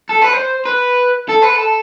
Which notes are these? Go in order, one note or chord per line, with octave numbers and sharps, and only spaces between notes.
A4
B4
C5
B4
A4
B4
A4